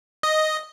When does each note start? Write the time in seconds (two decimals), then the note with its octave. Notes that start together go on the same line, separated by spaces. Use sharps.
0.23 D#5